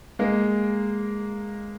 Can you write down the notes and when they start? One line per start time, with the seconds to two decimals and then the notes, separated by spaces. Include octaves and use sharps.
0.19 G#3 A#3